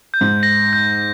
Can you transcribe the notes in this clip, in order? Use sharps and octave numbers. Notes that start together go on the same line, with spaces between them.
G6
G#2
A#6
G6